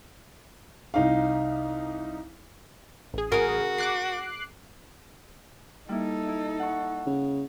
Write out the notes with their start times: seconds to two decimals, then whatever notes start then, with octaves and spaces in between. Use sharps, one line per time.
0.94 C2 D#4 F5
3.14 A1 G#4
3.32 C#3 F#4 A#4 D#5 F5
3.78 D5 D6 F#6 C7
5.89 G3 A#3 D#4 E4 A4
6.28 E4
6.59 F#5 C#6
7.06 C#3